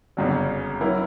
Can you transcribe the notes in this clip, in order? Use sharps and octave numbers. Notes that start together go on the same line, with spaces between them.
G1 F#2 C#3 F#3
F#3 C#4 E4 A#4